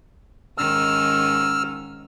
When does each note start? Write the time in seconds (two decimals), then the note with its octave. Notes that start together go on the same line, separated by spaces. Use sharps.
0.58 G#2 D#3 C#4 E6 F6